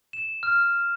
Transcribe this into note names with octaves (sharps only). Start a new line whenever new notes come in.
E7
F6